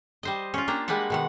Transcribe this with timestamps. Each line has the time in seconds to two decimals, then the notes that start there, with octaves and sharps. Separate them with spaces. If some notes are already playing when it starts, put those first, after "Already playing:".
0.23 G3 C5 D#5
0.54 C#4 F4
0.68 A#3 D4 G4 A#5
0.88 G3 G#3 A#3 B4 F#5
1.10 B2 D#3 F#5